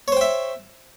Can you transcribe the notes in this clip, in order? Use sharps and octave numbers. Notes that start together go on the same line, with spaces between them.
C5 C#5 E5 G5